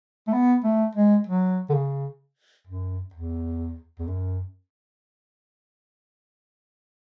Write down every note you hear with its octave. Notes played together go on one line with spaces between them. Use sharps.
A3
B3
A3
G#3
F#3
D3
C#3
F#2
E2
E2
F#2